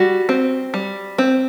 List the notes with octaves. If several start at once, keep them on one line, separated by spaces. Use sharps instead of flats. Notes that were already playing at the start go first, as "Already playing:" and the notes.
Already playing: G3 F#4
C4
G3
C4